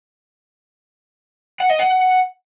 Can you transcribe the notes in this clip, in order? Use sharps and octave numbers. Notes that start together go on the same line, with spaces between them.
F#5
D#5
F#5